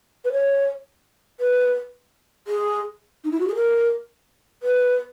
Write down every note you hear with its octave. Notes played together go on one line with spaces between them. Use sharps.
B4
C#5
B4
G#4
D#4
E4
F#4
G#4
A#4
B4